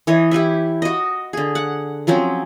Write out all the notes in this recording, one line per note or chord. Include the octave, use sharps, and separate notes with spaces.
E3 C#5 D#5
E4 G4 B4 E5
F#4 D#5
D3 G#4
F#5
F3 F#3 C4 C#4